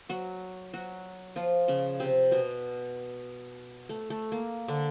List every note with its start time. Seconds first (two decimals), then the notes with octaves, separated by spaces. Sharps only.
0.09 F#3 F#4
0.73 F#3 F#4
1.36 F3 F4
1.68 C#3 C#4
2.00 C3 C4
2.31 B2 B3
3.89 A3
4.10 A3
4.32 A#3
4.68 D3 D4